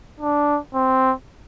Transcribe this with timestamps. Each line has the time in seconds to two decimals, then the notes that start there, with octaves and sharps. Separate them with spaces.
0.21 D4
0.75 C4